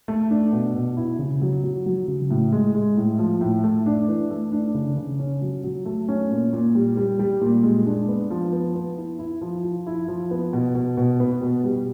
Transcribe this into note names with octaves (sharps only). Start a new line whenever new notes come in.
A3
D4
B2
B2
E4
C#3
F#3
F#3
F#3
C#3
A2
G#3
G#3
A2
F3
A2
A3
D4
E3
A3
D4
C#3
C#3
C#4
F#3
F#3
A3
C#4
A#2
A#2
G3
G3
G3
A#2
G#3
D4
B3
F3
B3
B3
E4
E4
F3
F3
E4
F3
B3
B2
B2
B2
B3
B2
G3